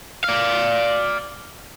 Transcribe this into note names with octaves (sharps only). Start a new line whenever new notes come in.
D5 F5